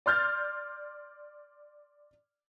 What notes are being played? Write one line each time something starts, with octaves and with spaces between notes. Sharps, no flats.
D5 C6 F6 G6 A6